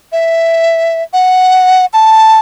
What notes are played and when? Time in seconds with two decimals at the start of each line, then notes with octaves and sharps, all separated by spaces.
0.12 E5
1.13 F#5
1.93 A5